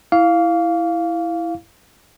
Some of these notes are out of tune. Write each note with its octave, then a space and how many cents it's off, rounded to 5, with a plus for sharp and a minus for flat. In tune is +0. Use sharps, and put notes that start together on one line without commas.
E4 +0 F5 +0 D6 -45